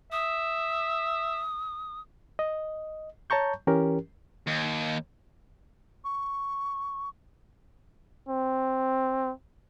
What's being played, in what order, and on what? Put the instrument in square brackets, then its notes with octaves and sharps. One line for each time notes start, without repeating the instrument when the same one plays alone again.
[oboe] E5 [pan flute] D#6
[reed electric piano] D#5
C#5 A5 A#5 C#6 G6
E3 C#4 G4 A#4
[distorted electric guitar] D#2
[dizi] C#6
[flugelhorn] C4